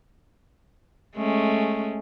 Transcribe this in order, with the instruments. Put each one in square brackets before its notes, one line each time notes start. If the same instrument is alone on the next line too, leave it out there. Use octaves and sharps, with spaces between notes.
[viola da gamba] G#3 A3 C#4